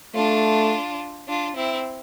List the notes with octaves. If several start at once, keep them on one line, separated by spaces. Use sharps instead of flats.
A3 D4 F4
D4 F4
C4 E4